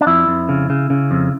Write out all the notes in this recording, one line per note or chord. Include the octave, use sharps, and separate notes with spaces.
D4
F2 E4
F2
C#3
C#3
C#3
F2